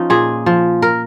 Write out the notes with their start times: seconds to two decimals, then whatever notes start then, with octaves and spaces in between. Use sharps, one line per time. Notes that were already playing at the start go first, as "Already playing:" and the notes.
Already playing: F3 C#4 D#4
0.10 A#2 G#4
0.46 F3
0.82 A#4